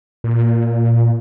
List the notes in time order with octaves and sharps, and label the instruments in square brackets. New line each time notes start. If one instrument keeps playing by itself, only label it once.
[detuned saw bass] A#2